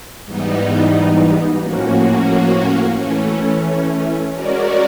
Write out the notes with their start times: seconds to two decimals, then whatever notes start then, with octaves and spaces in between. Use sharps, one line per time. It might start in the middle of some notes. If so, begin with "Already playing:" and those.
0.25 G#2 E3 G3 B3 D#4
1.61 A2 F3 A#3 C#4 F#4
2.96 E3 A3 C#4
4.31 G#3 C#4 F#4 A#4 D5